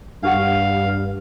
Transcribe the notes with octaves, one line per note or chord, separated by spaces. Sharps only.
G2 D4 G4 F5 F#5